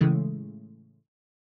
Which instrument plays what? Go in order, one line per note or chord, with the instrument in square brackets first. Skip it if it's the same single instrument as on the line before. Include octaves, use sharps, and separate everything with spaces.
[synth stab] A2 C#3 E3 G#3 A3